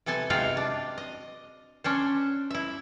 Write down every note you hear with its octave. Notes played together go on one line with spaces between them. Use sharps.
C3 B3 A4 G#5 A5
C3 G#3 C4 D#4 F4 F#4
D4
D#5
C#4 D4 C5
E4 E5